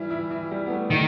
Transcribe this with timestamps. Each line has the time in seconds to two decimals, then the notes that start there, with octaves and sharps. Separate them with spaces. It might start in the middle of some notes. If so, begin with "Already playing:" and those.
Already playing: E3 G3 E4
0.10 E3 E4
0.30 E3 E4
0.51 G3
0.66 B3
0.71 A3
0.90 D#3 A3